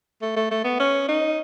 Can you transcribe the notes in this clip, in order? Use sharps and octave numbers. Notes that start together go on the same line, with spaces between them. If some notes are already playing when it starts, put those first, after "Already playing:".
A3
A3
A3
B3
C#4
D#4